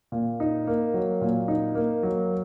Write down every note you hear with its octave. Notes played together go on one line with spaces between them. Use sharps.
A#2
D#4
A#3
F#3
A#2
D#4
A#3
F#3